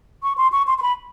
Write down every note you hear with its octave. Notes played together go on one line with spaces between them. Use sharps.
C#6
C6
C#6
C6
C6
B5